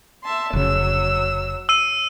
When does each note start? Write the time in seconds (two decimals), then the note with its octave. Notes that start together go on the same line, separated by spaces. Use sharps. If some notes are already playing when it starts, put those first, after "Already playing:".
0.24 E5 A5 C6
0.53 F1 C#3 F#3 E6
1.69 E6 D#7